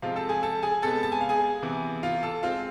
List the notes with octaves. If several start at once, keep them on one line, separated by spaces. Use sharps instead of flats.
C3 F3 G#3 C4 F4 F5
A4 A5
G#4 G#5
A4 A5
G#4 G#5
C3 G#3 B3 A4 A5
A5
G#5
F5
G#4 G#5
C3 E3 B3
F4 F5
A4 A5
G#3 C4 F4 F5